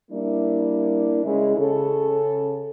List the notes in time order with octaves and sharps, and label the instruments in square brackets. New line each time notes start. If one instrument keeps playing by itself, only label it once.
[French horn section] G3 A#3 D4 E4
C#3 G#3 E4
C#3 A4